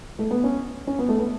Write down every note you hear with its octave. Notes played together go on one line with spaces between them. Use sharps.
A3
B3
C#4
C#4
B3
A3
B3